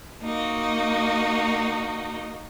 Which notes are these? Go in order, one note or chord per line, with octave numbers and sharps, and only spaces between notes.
A#3 D#4 F#4